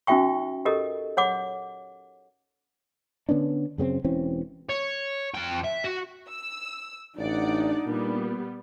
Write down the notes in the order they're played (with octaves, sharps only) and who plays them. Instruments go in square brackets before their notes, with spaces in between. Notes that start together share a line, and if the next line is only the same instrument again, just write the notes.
[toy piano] C#4 D#4 F#4 E5 G5 C#6
G4 A4 A#4 D#5
C#5 F#5 D6
[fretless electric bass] D3 B3 C#4 D4
F#2 C#3 B3 C4
E1 E3 C4 C#4
[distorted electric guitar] C#5
F2 G5
E5
F#4
[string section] E6
[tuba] A1 [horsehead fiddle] D4 D#4 [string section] D5 F#5
[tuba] A#2 [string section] G3 B3